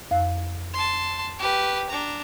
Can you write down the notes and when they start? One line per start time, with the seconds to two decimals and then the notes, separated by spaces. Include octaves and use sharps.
0.11 F2 F5
0.74 A5 C6
1.39 G4 B4
1.89 D4 A#5